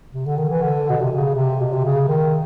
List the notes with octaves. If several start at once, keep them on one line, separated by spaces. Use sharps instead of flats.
C3
D3
D#3
E3
D3
B2
C3
C#3
C3
B2
C3
C#3
D#3